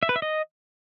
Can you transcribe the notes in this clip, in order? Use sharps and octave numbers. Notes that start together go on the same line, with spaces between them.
E5
B4
E5
D#5